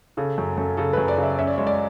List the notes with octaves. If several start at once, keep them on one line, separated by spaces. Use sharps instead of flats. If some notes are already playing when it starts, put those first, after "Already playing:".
C#3 A4
F#2
F#2 A4
C#3 A4
F#2 B4
D5
C#3 E5
C#4 E5
D5
G#3 C#5
D5